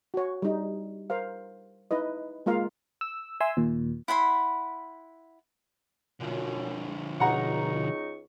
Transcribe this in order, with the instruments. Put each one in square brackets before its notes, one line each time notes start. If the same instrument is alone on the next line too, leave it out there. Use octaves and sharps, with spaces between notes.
[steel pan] F#4 C#5
G3 D#4
A#4 C5 F5
D#4 E4 B4 D#5
G#3 A#3 F4 A#4 F5
[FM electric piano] E6
E5 G#5 C6 E6
D#2 A#2
[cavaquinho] E4 F#5 B5 C6
[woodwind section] F#2 B2 [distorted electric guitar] D3 F3
[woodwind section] C#2 D#4 C#6 [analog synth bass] B2 [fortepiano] F#5 A#5